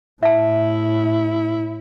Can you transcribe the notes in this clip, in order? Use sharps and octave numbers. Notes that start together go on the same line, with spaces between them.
A2 E4 E5 A5